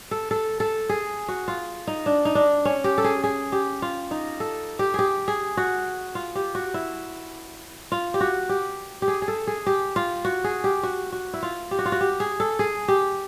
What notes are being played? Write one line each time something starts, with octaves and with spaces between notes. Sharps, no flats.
A4
A4
A4
G#4
F#4
F4
D#4
D4
D#4
D4
C#4
G4
A4
G#4
G#4
G4
F4
D#4
A4
G4
G4 G#4
G#4
F#4
F4
G4
F#4
E4
F4
G4
F#4
G4
G4
G#4
G#4
A4
G#4
G4
F4
F#4
G#4
G4
F#4
F#4
E4
F4
G4
F#4
F4
F#4
G4
G#4
A4
G#4
G4